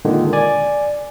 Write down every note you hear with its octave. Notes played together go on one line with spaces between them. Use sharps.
A#2 D3 D#3 G#3
D5 G#5